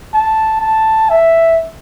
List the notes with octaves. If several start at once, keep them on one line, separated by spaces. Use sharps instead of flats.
A5
A5
E5